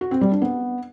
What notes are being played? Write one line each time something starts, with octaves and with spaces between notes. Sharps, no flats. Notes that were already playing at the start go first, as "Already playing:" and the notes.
F#4
C4
G3
D4
B3